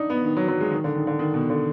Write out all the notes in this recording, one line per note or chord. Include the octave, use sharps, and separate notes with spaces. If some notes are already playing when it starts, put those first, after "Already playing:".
Already playing: D4 D#4
B3
D#3
F#3
F#3
G#3
D#3
D3
D#3
D3
D#3
B2
D3